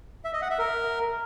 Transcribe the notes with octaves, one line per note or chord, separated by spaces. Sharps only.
E5
D#5
F#5
E5
A#4